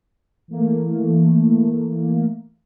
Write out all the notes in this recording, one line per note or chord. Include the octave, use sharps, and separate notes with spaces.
E3 A3 A#3